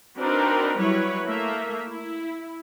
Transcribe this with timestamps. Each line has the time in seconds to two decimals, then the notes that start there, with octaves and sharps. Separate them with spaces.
0.18 C4 D4 D#4 F#4 A#4 B4
0.78 F#3 G3 E4 B4 C#5
1.24 A3 A#3 E5
1.87 E4